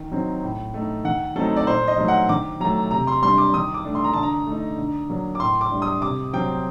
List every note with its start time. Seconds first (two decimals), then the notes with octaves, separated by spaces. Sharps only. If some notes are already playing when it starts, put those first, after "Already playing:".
Already playing: D#3
0.12 F#3 C4 D#4
0.43 A2
0.74 A3 D#4
1.05 D#3 F#5
1.36 F#3 A3 C4 D#4 A4
1.57 D5
1.67 A#2 C5
1.88 D#5
1.98 F#3 A3 D#4
2.08 F#5
2.29 D#3 D6
2.60 F#3 A3 A#5
2.91 C3 A#5
3.07 C6
3.23 G3 D4 C6
3.38 D6
3.54 D#3 D#6
3.74 D6
3.85 A3 D4
3.95 C6
4.04 A#5
4.13 D3 A5
4.23 A#5
4.47 A3 D#4
4.78 D3
5.10 F#3 A#3 D4
5.35 D6
5.40 A2 C6
5.61 D6
5.71 G3 D4
5.82 D#6
6.02 C3 D6
6.33 F#3 C4 G5